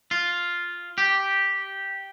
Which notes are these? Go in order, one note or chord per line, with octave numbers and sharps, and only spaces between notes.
F4
G4